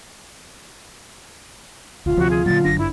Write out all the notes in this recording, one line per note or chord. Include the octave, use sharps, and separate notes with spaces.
D#1 D2 F4
D2 C3 F3 F#4
G#4
A#2 D3 F#3 A6
F#1 D4 A#6
G1 E4